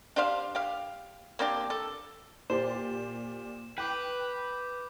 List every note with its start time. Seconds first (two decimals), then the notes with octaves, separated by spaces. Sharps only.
0.16 D4 G4 C5 F5
0.55 G4 F5
1.39 A#3 C4 D4 G4
1.70 A4
2.50 A#2 G4 C5 D5 E7
3.78 B4 G5 D6 G6